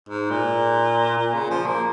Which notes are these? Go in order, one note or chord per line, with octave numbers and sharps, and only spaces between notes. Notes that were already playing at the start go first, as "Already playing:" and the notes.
G#2
A#2
A#2
C#3
F3
A#3